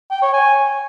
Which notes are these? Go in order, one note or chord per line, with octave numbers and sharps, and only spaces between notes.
G5
C#5
G#5